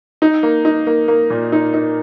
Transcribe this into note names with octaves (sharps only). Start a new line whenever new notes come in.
D#4
A#3
D#4
A#3
A#3
A#2
D#4
D#4